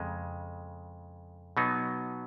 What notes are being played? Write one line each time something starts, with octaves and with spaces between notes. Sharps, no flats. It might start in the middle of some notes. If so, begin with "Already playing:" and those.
Already playing: F2 C#3 G#3
B2 F#3 B3 D#4